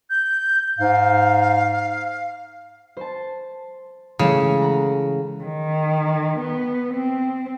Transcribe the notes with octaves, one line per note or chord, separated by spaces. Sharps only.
G6
G#2 F5
C5 A5
C#3 E3 G#3 A3
F#5 A#5
D#3
B3
C4